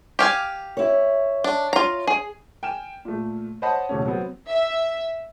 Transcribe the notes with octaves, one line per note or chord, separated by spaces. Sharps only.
G4 F5 G#5
E4 C#5
D4
F4 A#5
G#4
G5 G#5 F6 E7
A#2 A3
C5 C#5 D#5 F#5 A5 B5
D#1 C3 A3 C#4
F#3 B3 C4
E5